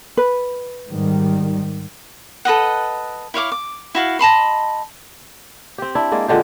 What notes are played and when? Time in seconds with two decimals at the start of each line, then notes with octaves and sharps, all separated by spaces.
0.17 B4
0.89 G#2 D#3 G3
2.45 A4 B4 D#5 F#5
3.34 E4 C#5 F5 D6
3.52 D6
3.95 E4 F#4 F5
4.19 D#5 A5 B5 C6
5.78 C4 G4
5.95 D4 E4
6.12 G#3 A#3 D5
6.28 A#2 D3 G#3 G4